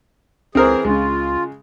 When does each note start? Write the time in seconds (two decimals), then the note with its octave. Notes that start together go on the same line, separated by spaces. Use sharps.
0.55 C#2 E3 C4 G#4 A#4 C5
0.85 C#2 C#3 G#3 F4